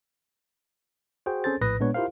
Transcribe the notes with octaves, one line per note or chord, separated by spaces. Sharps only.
F#4 G#4 C5 G5
C4 C#4 G#4 A4 C5 A6
A#1 A2 B4 D#6 A#6
A#2 G#3 B3 D4 B4 C#5
E4 F4 G4 A#4 C5 F5